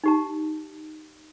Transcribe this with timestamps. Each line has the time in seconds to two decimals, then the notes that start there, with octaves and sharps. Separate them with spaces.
0.04 D#4 G4 A5